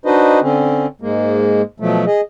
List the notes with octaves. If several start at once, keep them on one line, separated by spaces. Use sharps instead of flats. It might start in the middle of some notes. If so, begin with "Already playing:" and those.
D4 D#4 F#4 B4 C5 D#5
D3 C4 C#4
G#2 G#3 A#3
B2 F3 F#3 A3
G#4 D#5